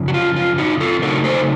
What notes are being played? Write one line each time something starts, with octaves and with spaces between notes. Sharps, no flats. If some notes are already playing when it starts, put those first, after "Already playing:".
Already playing: F#2 C#3 F3
F#4
F4
F4
D#4 F#4
F4 A4
C#3 F#3 A3 D#4 F#4 A#4
A4 C5